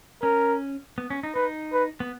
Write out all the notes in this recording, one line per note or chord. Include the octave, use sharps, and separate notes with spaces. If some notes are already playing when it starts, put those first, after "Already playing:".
C#4 A#4
B3
C#4
D#4
D#4 B4
B4
B3